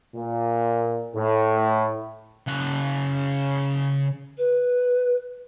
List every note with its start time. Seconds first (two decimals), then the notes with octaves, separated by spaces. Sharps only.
0.15 A#2
1.16 A2
2.48 C#3 F#5
4.38 B4